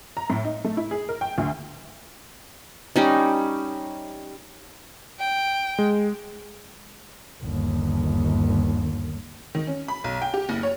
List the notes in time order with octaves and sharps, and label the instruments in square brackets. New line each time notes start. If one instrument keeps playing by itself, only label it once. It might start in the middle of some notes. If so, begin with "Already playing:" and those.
[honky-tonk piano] A#5
A2
D#4
A3
E4
G#4
A#4
G5
D2
[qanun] G3 C#4 D#4
[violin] G5
[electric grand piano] G#3
[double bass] G1 D#2
[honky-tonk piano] D#3
C#4
B5
B1
G5
G4
F#1
C#5